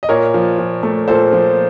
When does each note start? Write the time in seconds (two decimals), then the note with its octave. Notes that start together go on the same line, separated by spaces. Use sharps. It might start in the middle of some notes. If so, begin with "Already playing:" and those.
0.03 D#5
0.09 A#2 A#4 C#5
0.34 F3
0.58 A#2
0.83 A3
1.08 A#2 A4 C5
1.33 F3